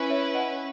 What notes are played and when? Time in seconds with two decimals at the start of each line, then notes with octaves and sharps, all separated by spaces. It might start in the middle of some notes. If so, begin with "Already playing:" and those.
Already playing: C#4 E4 B4
0.10 C#5 E5
0.34 D#5 F#5